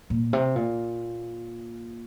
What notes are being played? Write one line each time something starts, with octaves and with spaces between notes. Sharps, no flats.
A#2
C3
A#2